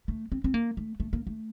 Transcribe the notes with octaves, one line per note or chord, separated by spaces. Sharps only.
A3
C4
C4
A#3
A3
A3
A#3
A3